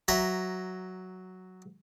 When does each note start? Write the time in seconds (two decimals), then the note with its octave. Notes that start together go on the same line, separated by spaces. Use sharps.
0.08 F#3 E5 A#5